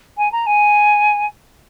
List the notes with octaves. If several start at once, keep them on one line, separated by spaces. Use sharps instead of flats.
G#5
A#5
G#5